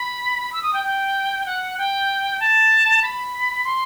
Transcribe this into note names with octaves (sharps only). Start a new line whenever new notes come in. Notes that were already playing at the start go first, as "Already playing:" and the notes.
Already playing: B5
E6
D#6
G5
G5
F#5
G5
A5
B5
C6